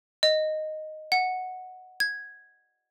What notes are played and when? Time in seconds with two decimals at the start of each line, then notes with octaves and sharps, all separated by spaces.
0.23 D#5
1.12 F#5
2.00 G#6